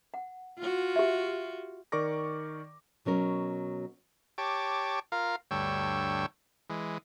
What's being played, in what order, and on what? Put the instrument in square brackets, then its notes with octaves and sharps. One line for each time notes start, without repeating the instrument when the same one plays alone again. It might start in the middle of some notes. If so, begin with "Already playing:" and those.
[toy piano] F#5
[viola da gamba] F4 F#4
[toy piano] G4 E5
[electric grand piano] D#3 A#4 D5 C#6 D6 A#6
[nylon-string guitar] B2 F#3 C#4 A#4
[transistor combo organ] G4 C#5 A5 D6
F4 A#4 F5
D2 G2 C#5 G5 E6
E3 G#3